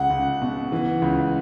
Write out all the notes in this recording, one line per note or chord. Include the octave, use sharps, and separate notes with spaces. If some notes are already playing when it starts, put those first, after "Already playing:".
Already playing: C#2 F#5
C#2
B2
E3
C#2